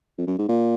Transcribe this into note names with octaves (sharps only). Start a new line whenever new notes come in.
F2
F#2
G#2
A#2